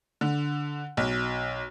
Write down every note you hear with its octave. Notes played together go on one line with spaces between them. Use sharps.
D3
B1